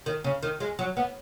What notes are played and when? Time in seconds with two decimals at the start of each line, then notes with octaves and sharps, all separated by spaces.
0.06 D#3
0.24 C#3
0.42 D#3
0.60 G#3
0.79 F#3
0.97 B3